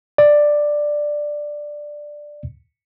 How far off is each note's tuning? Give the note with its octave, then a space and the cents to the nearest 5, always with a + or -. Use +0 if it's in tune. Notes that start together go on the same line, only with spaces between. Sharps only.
D5 +5